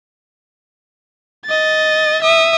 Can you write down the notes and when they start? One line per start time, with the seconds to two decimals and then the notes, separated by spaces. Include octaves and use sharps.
1.46 D#5 A6
2.22 E5 D#6